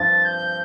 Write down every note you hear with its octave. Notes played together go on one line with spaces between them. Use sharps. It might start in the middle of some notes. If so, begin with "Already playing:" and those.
Already playing: G2 F3 C4 F4 A6
G6